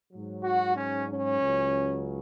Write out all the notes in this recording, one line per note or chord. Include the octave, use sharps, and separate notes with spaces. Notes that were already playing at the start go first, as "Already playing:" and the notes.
G#2 F#3
F#4
C#4
C#4
C#2 C#3 F#3